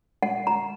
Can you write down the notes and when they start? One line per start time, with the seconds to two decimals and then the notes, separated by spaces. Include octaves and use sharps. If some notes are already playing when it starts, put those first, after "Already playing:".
0.23 F#5
0.47 A#5